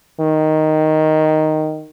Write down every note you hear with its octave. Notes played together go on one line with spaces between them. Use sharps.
D#3